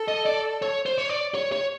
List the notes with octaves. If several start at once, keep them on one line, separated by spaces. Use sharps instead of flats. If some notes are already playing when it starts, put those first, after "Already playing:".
Already playing: A4
D#5
D5
C#5
C5
C#5
D5
C#5
C#5